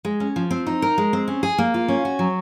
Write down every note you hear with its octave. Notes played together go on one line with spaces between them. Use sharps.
G#3
C#4
F3
C4
D#4
A#4
G#3
C4
C#4
G#4
A#3
F4
C#4
F#4
F#3